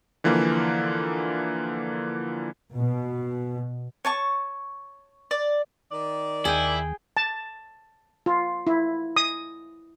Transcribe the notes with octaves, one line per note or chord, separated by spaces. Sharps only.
D3 E3 F3 A#3
B2
C#5 A5 C#6
D5
D#3 D5
D#2 E4 G#4 G5
A5
F4
E4
D#6